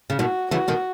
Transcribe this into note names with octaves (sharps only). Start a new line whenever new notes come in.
C#3
B2 D#3 F#4
C#3 E3 F#4
B2 D#3